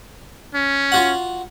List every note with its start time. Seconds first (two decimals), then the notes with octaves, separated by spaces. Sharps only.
0.54 C#4
0.92 F4 F#4 F#5